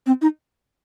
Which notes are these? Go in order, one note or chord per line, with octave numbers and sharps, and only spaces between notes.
C4
D#4